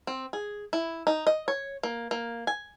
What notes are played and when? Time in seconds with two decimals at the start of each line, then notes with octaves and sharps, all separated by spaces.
0.07 C4
0.33 G#4
0.73 E4
1.07 D#4
1.27 D#5
1.48 C#5
1.83 A#3
2.11 A#3
2.47 G#5